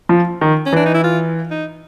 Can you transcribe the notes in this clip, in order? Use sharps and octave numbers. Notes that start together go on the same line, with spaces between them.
F3
D#3
C#4
E3 D4
D#4
E4
F4
D#4